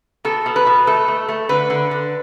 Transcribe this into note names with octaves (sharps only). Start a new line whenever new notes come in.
B2 A4
B2
B4
B2
A3 A4
A3
A3
D3 B4
D3
D3